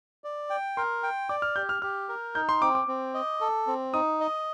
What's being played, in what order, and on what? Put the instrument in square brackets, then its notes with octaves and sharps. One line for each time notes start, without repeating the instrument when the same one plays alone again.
[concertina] D5
G5
[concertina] A#4 [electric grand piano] C6
[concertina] G5
[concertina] D5 [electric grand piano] D6
[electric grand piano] F6
[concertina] G4 [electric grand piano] G6
[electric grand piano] F6
[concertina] G4 [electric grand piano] F6
[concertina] A#4
[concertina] D#4 [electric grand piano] G6
[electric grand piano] C6
[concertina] C4 [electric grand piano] D6
[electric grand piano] D6
[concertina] C4
D#5
A4
C4
[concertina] D#4 [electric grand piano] D#6
[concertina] D#5